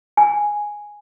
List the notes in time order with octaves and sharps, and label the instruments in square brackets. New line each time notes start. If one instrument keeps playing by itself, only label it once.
[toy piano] G#5